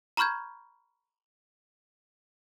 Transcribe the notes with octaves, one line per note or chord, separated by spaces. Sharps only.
A#5 B5 C#6 F6 G6 G#6